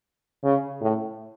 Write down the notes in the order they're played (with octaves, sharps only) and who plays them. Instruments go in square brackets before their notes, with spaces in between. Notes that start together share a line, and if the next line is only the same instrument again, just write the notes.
[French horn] C#3
A2